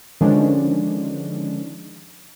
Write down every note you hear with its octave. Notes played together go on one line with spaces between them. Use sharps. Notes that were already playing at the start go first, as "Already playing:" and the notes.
D3 D#3 F3 G#3 C#4 D4